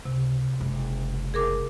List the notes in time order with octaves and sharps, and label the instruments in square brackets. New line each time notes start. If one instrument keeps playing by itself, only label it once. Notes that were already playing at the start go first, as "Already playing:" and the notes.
[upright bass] C#2 [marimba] C3
[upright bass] F#1 G#3
[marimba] G#4 A#4 D6